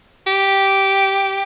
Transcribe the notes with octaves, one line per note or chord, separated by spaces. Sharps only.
G4